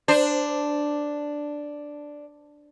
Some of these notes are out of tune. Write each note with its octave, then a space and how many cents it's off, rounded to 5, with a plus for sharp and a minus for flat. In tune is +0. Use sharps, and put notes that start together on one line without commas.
D4 +0 C5 -15